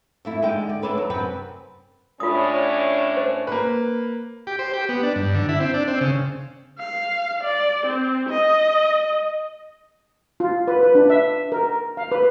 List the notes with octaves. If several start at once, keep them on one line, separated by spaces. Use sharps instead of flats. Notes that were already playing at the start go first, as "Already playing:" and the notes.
F2 A3 E4
E2 D3 G#3 D#4 G5
D5
D4 E4 A4 B4 C#5 D5
F#3
F#2 C3 B4 G5
A2 C#4 D4 F4 D#6
C5
A#3 B4
G4
C5
G4
B3
D4
G2
D3
E4
C4
D4
C4
C#3
F5
D5
C4
D#5
F4
B4
B4
D4
E5
A#4
F5
B4